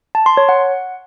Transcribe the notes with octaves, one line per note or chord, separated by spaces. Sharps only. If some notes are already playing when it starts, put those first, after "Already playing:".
A5
C6
C#5
F#5